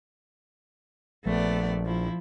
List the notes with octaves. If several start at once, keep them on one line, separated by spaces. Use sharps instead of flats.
A#1 A3 B3 D5
F3 E4